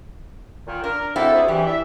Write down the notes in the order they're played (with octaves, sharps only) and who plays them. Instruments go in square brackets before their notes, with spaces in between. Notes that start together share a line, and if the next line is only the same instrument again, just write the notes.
[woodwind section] A#2 D#3
[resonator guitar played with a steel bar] D4 [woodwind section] A#4
[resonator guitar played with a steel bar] G#3 C4 E4 [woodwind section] A#3 F#4 A4
[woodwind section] D2 G#4
[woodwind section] G2 C3 E3 [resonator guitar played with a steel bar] G4
[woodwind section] E4 D5 E5